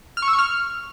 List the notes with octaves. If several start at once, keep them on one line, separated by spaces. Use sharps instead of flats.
F6
C#6
E6
C#6
F6